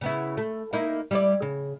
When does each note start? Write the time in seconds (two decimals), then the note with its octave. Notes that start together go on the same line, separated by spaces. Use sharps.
0.01 C#3 B3 E4
0.37 A3
0.73 A#3 D#4 E4
1.11 G3 E4 D5
1.42 C#3